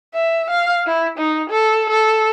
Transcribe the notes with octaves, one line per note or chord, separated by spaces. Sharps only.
E5
F5
E4
D#4
A4
A4